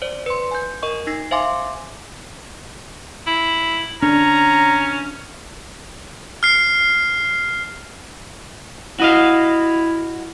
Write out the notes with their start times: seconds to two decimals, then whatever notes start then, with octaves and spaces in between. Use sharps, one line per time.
0.02 C5 D5
0.26 B4 C6
0.51 G#5 G6
0.83 A#4 D#5 C#6
1.07 D#4 A#6 C7
1.31 C5 E5 F5 G#5 C6 D6
3.27 E4
4.03 C#4 D4 A#5
6.43 F6 C7
9.00 E4 F#4 D#5 F5